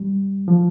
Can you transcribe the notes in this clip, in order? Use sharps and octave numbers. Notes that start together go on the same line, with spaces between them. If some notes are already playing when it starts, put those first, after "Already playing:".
Already playing: G3
F3